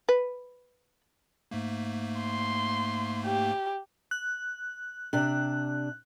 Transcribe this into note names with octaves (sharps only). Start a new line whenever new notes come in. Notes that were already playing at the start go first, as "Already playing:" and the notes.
B4
G#2 A3 A#3
C6
G4
F#6
C3 D4 F#6